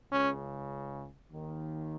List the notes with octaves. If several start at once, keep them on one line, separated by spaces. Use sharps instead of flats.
C#2 C#3 C#4
D#2 D#3